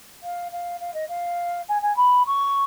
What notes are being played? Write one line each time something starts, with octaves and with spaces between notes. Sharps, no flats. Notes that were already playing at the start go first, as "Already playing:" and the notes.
F5
F5
F5
D#5
F5
G#5
G#5
B5
C#6